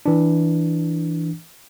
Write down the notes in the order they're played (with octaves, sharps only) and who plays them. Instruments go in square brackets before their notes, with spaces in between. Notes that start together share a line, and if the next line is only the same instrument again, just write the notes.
[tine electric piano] E3 D4